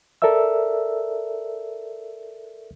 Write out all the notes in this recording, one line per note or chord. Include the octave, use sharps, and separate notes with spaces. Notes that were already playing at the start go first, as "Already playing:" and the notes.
A4 A#4 D5 E5 E6